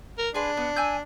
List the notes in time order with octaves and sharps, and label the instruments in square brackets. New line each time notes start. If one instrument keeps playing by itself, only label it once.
[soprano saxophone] A#4
[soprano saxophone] D4 [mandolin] G#4 B4 C6
[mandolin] B3
G#5 E6 G6